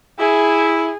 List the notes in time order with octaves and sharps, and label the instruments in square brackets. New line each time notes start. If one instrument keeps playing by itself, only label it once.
[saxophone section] E4 [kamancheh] G#4